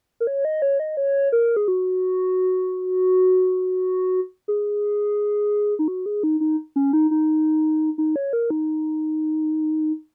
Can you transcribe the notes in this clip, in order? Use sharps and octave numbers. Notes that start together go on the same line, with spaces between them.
A#4
C#5
D#5
C#5
D#5
C#5
A#4
G#4
F#4
G#4
D#4
F#4
G#4
D#4
D#4
C#4
D#4
D#4
D#4
C#5
A#4
D#4